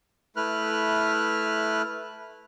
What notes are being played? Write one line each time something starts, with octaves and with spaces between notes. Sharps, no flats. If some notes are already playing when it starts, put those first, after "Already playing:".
A3 E4 B4 F6 F#6